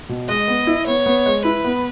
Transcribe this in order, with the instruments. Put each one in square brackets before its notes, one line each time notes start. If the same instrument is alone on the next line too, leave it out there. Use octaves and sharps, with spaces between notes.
[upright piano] B2
[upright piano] G#3 [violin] D#5
[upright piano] B3
E4
[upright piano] B3 [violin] C#5
[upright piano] B3
G#3
[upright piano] E4 [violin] B4
[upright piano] B3